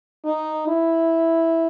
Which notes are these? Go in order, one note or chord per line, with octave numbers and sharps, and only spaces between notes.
D#4
E4